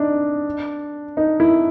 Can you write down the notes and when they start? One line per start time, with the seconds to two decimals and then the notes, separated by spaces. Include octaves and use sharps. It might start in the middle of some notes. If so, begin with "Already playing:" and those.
Already playing: D4 D#4
1.17 D#4
1.40 E4